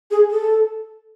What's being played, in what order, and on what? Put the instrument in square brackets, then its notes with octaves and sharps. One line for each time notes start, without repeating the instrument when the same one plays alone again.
[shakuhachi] G#4
A4